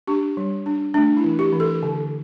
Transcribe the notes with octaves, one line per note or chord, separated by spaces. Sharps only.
D4 G4
G3
D4
A3 D4
E4
E3
G4
E3
A4
D3